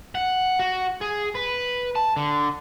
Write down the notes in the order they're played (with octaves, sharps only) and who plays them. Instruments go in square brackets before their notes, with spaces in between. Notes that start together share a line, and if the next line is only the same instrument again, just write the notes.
[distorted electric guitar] F#5
F#4
G#4
B4
A5
D3